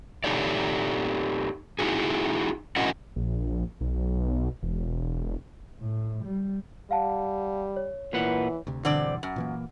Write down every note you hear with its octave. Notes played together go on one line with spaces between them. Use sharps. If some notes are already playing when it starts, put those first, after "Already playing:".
D#4 G4 A4 C#5 D5
D#4 E4 F#4 G#4
C#4 E4 F#4 A#4 D#5 F#5
A#1
B1
E1
A2
G3
G3 F5 F#5 A5
C#5
A#2 E3 B4 F#5
D2 C3
G2 B2 D3 E3 C4 D5
F#2
A#2 E3 A#3